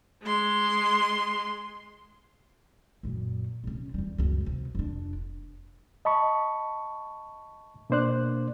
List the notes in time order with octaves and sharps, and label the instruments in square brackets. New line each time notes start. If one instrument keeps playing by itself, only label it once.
[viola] G#3 C6
[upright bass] F#2 A#2
C3 C#4
E2 G3
C#2 F#2
C3
F1 D4
[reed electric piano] D#5 A5 B5 C#6
B2 A#3 D4 C5 D5 F#6